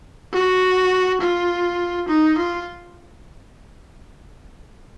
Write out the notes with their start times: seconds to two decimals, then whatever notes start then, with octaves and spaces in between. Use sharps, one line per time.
0.33 F#4
1.21 F4
2.08 D#4
2.38 F4